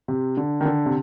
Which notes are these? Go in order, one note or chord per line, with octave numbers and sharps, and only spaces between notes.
C3
D3
D#3
D3
C3